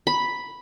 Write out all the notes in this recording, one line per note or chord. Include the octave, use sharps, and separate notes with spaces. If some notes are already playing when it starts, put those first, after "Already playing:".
B5